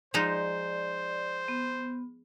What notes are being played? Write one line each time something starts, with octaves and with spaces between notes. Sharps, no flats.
F3 G#3 D#4 C5 D5
B3